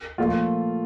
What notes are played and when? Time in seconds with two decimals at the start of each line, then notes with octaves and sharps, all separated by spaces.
0.18 A#2 F3 A3 F4